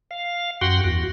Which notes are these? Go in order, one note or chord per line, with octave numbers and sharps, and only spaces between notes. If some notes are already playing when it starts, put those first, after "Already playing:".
F5
F#2 F#4 F#5 G5 C6
E2 F#4